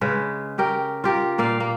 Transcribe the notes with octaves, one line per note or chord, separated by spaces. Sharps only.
C#3 G#3 B4
C#4 G4 A#4 G5
F4 G4 A#4
A#2 A#3 D5 F5
A#3